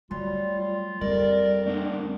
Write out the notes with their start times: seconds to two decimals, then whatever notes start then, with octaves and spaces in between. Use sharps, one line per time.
0.11 F#3 G3 A3 F4
0.58 F4
1.01 F2 G3 A#4 D5
1.67 A3 A#3 C4 D4